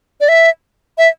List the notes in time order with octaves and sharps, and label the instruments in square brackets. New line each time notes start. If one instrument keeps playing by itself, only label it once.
[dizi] D5
E5
E5